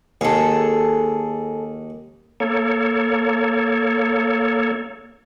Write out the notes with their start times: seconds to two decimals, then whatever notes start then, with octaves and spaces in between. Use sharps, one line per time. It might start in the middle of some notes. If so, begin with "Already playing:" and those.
0.21 D#2 G#4 A4
2.40 A#3 A4 C#5